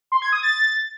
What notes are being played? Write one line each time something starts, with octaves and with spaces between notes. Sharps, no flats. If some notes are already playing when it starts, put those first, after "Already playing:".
C6
G#6
D#6
A6